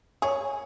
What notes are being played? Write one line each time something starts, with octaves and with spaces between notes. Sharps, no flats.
G#4 C#5